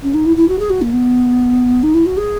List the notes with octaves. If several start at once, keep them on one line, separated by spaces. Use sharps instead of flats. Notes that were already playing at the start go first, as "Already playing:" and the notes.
C#4
D#4
E4
E4
F#4
G#4
F#4
A#3
B3
D#4
E4
F#4
G#4